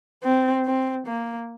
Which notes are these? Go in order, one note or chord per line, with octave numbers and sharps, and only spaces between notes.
C4
C4
A#3